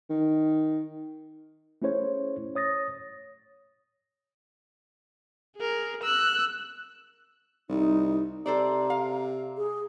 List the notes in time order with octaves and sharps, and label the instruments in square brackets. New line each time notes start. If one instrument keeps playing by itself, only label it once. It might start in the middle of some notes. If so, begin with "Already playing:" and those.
[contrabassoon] D#3
[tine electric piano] A3 C#4 E4 G#4 C5 C#5
C#5 D#6 A6 A#6
[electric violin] G#4 A#4
E6 F#6
[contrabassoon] C2 [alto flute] D#4
[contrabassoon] C3 [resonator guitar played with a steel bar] A4 C5 D5 [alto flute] A#5
[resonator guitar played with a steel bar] F5
[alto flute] G#4